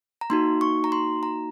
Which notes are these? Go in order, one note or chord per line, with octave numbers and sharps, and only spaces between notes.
A#5
A#3 D#4 F#4 C6
C#6
A#5
C6
A#5